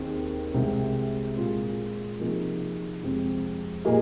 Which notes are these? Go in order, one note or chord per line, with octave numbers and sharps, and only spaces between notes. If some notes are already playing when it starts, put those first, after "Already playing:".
Already playing: D#2 D#3 C4 G#4
C2 C3 G#3 C4
A#2 G#3 C4 F4
C3 F3 A#3 D#4 G#4
F2 C3 G#3 C4
A#2 A#3 G#4 D#5